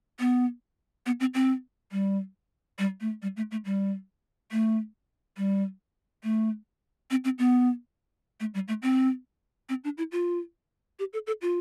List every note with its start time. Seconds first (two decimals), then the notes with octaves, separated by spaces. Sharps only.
0.19 B3
1.06 B3
1.20 C4
1.34 C4
1.92 G3
2.79 G3
3.01 A3
3.22 G3
3.37 A3
3.51 A3
3.65 G3
4.52 A3
5.37 G3
6.24 A3
7.11 C4
7.24 C4
7.39 B3
8.40 A3
8.54 G3
8.68 A3
8.82 C4
9.69 C4
9.84 D4
9.98 E4
10.12 F4
10.99 G4
11.13 A4
11.27 A4
11.42 F4